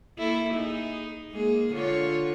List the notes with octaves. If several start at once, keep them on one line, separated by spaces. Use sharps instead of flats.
A#3 E4 A4
D#4 G#4
G#3 A#3 G#4
D3 F4 C#5